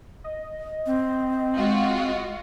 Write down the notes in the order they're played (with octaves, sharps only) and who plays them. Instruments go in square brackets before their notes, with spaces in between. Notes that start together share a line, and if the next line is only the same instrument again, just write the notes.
[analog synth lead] D#5
[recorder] C4
[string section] G#3 F4 F#4